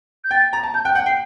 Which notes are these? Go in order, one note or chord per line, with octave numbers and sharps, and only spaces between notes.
G6
G5 A6
A#5
A5
A5 G6
G5 F#6
F#5 G6
G5 C7